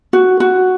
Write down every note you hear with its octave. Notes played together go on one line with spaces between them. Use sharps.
F#4
F#4